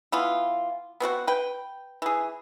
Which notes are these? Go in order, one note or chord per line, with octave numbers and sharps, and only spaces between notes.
E3 B3 F4
B3 C4 F#4 F#5
B4 G5
E3 G#4